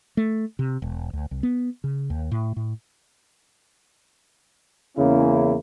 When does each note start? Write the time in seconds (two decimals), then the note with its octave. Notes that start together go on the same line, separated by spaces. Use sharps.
0.17 A3
0.59 C3
0.82 E1
1.13 D2
1.31 C2
1.43 B3
1.84 C#3
2.10 D#2
2.31 A2
2.56 A2
4.97 E2 C#3 A#3 C#4 E4